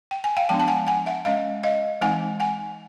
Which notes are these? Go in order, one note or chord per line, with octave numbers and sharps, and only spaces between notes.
G5
G#5
F5 G5
F3 G#3 B3 D4 G5 A5
A5
F#5 G#5
F#5 G#5
E5 F#5
G#3 C#4 D#5 F5
D#5 F5
E3 G#3 C4 D#4 F#5 G#5
F#5 G#5